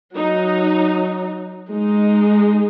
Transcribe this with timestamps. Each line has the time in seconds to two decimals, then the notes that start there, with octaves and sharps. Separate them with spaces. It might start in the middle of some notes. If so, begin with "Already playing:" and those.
0.16 F#3 D#4
1.71 G#3 D#4